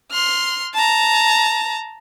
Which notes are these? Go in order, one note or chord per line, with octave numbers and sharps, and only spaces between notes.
C6 F6
A5 A#5